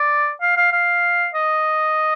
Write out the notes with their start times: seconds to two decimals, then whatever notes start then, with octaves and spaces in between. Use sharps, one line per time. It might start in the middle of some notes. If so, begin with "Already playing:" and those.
Already playing: D5
0.42 F5
0.57 F5
0.73 F5
1.35 D#5